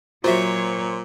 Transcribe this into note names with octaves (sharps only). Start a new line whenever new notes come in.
A#2 F#3 F4 F#4 C5 C#5 E5